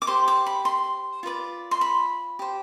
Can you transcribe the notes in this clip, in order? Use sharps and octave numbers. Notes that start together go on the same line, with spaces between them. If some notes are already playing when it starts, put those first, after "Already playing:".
D6
G4 C5 C6
D6
B5
C6
F4 B4 D5
C6
B5
G4 C5